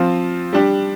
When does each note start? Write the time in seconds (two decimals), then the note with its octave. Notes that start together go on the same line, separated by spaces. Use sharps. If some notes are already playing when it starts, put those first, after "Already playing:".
Already playing: F3 C4 F4
0.53 G3 D4 G4